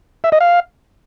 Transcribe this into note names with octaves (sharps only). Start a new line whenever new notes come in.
E5
D#5
F5